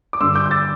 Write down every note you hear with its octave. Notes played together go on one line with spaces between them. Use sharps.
D6
G2 D3 C6 E6
D6 G6
G6
E6 A6